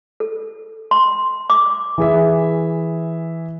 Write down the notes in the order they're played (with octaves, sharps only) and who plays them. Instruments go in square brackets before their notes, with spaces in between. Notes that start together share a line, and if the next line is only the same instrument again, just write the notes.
[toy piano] A4
C6
D6
[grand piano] E3 G#4 E5